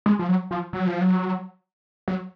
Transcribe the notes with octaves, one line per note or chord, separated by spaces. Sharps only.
G#3
F3
F#3
F3
F#3
F3
F#3
F#3